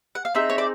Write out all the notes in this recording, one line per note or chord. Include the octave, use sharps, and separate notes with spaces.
F#5
F5
C4 D#4 G#4 E5
C#5
D5